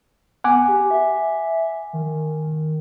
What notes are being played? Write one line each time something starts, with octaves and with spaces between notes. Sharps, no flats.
B3 F#5 G#5 D6
G4
E5
D#3